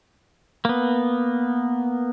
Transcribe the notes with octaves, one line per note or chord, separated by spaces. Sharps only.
A#3 B3